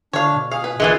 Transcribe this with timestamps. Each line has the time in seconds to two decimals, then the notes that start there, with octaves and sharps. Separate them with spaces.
0.13 D3 D4 C#5 F5
0.36 B2
0.51 G#4 F5
0.64 B4
0.80 A1 A#2 E3 G#3